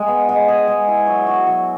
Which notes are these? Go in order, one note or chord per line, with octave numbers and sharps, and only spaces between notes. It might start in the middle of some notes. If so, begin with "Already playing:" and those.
Already playing: G#3 G#4
B3
G#3
G#4
G#3
E4
F#3
F#4
F#3